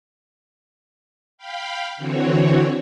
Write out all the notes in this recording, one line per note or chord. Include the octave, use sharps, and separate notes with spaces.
F5 G5 B5
D3 E3 C4 F#4 C#5